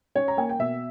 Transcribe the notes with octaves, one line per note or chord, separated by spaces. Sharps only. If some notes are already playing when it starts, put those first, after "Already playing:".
C#4 C#5
A#5
A#3 G#5
G5
B2 E5